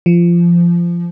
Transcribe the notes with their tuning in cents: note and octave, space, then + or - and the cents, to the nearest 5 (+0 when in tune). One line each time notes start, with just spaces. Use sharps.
F3 -20